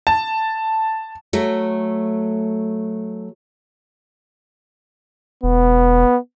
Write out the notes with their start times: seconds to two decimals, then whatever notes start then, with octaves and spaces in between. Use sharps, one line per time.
0.07 A5
1.33 F#3 A3
5.43 E1 B3